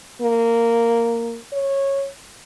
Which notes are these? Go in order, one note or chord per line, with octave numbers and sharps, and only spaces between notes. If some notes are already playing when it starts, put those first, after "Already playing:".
A#3
C#5